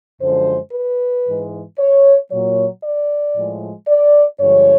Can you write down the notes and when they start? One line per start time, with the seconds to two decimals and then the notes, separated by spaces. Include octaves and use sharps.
0.21 F#2 D3 F3 G#3 C5
0.73 B4
1.25 G#2 E3 G#3
1.79 C#5
2.31 A#2 F#3 C#5
2.83 D5
3.35 A2 F3 G#3
3.88 D5
4.40 G2 D3 F3 G#3 C#5